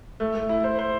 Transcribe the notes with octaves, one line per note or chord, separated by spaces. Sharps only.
A3
A3
E4
C5
C5